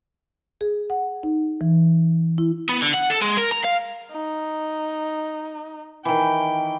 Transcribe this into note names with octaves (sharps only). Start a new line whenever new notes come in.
G#4
F#5
D#4
E3
E4
B3
D3
F#5
A4
G#3
A#4
A#5
F5
D#4
D#3 E3 G5